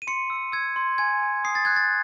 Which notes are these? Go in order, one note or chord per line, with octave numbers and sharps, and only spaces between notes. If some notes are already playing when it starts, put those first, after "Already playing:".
D#7
C6 C#7
E6
E6 G#6
C6
G#5 G#6
G#5
D#6 C7
A6
F#6 G#6
A6